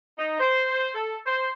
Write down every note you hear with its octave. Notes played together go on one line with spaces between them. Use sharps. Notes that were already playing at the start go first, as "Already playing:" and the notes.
D#4
C5
A4
C5